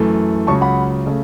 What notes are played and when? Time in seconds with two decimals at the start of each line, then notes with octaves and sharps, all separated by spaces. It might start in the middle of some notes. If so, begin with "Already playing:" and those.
Already playing: F#2 E3 A3
0.47 C#2 C#3 F#3 A5 C#6
0.61 F#5 B5
1.06 C#3 A3